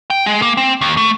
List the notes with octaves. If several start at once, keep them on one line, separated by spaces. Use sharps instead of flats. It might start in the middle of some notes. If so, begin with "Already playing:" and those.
G5
G#3
A#3
C4
D#2
A3